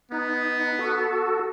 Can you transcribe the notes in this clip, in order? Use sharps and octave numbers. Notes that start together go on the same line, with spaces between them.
B3 D#4
F#4 A4